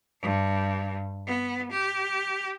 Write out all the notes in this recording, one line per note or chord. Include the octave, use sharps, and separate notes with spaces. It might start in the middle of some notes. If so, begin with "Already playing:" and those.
G2
B3
G4